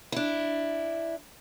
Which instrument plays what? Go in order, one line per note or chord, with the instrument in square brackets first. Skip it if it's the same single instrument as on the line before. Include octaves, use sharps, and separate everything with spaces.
[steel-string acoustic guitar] D4 E4